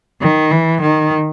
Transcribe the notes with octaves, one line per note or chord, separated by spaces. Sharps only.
D#3
E3
D#3